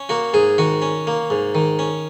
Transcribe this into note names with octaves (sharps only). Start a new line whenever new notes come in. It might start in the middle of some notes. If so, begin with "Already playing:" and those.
Already playing: C#4
A#3 F#4
G#2 G#4
D#3 F#4
C#4
A#3
G#2
D#3
C#4